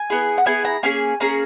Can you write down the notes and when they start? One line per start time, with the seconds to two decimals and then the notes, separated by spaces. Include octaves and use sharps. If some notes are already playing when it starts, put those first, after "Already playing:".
Already playing: G#5
0.10 B3 E4 G#4
0.38 F#5
0.46 B3 E4 G#4 G#5
0.65 A#5
0.83 A#3 C#4 G#4 G#5
1.20 A#3 C#4 G#4 A#5